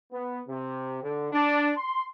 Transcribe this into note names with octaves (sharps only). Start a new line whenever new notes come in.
B3
C3
D3
D4
C6